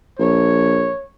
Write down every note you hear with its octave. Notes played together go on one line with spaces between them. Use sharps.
A#1 C#5